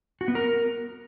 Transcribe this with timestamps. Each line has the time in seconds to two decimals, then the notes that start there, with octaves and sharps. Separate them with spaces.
0.21 F#4
0.28 B3
0.35 A#4